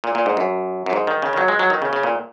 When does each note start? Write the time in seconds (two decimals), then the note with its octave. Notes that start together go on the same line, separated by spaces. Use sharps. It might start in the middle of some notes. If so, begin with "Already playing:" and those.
0.04 A#2
0.15 A#2
0.26 G#2
0.37 F#2
0.86 F#2
0.93 G#2
1.07 D#3
1.22 C#3
1.33 D#3
1.37 F#3
1.48 G#3
1.59 F#3
1.70 D#3
1.82 C#3
1.93 C#3
2.03 A#2